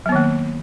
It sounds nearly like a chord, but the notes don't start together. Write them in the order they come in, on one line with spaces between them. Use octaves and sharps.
F#3 B3 D#3 A#3